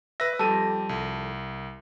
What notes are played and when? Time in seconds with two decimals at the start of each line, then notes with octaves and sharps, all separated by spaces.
0.20 B4 E5 A#6
0.39 F2 G3 G4 A4 D#7
0.89 C2